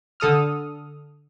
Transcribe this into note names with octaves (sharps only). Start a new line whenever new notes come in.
D3 A4 D#6 F6